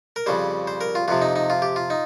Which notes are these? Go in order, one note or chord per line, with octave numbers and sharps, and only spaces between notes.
A#4
F2 C#3 G3 C5
C5
A#4
F4
F2 C3 F3 F4
D#4
D#4
F4
G4
F4
D#4